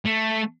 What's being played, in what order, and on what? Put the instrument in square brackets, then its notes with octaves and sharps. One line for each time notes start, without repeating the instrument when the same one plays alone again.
[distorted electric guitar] A3